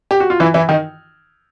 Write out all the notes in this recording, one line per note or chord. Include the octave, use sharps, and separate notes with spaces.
G4
F#4
F4
E3 E4
E3 E4
D#3 D#4